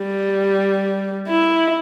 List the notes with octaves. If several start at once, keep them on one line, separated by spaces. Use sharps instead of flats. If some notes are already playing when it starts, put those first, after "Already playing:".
Already playing: G3
E4